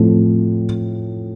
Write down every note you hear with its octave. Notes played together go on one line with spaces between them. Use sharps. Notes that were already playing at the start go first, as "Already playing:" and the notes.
Already playing: A2 F3 A3 C4